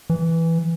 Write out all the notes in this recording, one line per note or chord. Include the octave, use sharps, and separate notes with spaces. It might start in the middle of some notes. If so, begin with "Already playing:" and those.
E3